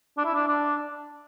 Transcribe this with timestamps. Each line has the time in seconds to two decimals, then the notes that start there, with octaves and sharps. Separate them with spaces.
0.18 D4
0.25 E4
0.34 D4
0.48 D4